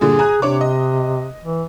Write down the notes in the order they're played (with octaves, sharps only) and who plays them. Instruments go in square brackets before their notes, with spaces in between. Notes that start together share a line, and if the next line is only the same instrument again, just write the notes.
[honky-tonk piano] G2 A#2 D3 [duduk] G#4
[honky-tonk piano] G#5 A#5 F#6
[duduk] C3 [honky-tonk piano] D4 C#5 D6
[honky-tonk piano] D#5
[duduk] E3